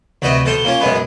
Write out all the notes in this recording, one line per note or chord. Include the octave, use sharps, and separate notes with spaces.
D2 C3 F#4 B4 D#5
B2 A4 C5 C6
A#3 C#4 F4
F#2 B2 G#3 B3 B4